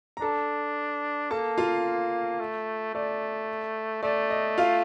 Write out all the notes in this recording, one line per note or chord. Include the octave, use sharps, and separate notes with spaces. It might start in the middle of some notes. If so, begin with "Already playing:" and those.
A#5
D4 A4 A5
A#3 A4 A5
F4 F5
A3
A3 D5
A3 D5
D#5
F4 F5